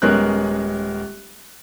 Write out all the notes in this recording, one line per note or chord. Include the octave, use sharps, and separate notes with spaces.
D#1 G#3 B3 C#4 A#4 F#6